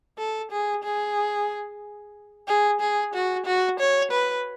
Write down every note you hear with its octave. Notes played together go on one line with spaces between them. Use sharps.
A4
G#4
G#4
G#4
G#4
F#4
F#4
C#5
B4